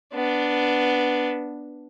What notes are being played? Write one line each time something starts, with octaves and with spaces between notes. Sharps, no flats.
B3 D4